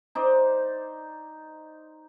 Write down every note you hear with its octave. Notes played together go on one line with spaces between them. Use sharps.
D#4 C5 D5